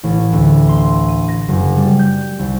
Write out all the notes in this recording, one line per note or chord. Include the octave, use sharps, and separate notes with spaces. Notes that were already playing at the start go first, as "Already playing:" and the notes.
A1
D2
C6
D#7
A#6
F#1
G3
G6
C2